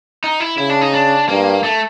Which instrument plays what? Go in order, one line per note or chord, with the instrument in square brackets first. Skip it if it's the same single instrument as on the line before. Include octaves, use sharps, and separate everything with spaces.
[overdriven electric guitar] D#4
E4
[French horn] C#3 [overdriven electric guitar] E4
[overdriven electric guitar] D4
D#4
D4
[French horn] G2 [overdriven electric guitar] A#3
[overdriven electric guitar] A3